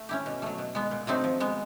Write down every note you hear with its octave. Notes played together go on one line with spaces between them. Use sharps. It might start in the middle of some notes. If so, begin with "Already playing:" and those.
Already playing: A3
C#4 E4 G4
B2
F#3 A3
B2
G#3 B3
A#2
F#3 A3 C4 D#4
F3
G#3 B3